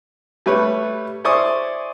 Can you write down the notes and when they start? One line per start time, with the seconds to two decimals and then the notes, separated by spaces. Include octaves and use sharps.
0.46 G3 A3 B4 C#5
1.24 E4 C5 D5 G#5 C#6 D#6